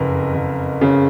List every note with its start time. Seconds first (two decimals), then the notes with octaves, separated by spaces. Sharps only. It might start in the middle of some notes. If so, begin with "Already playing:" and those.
Already playing: F#1 F2 A#4 B4
0.35 F#1
0.81 C#3